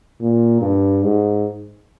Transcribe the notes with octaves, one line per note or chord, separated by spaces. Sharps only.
A#2
G2
G#2